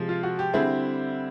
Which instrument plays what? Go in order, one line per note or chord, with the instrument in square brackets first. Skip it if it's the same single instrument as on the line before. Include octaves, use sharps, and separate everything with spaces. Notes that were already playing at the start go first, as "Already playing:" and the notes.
Already playing: [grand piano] C3 F3 G#3
F4
F#4
G4
D3 G3 C4 E4 G#4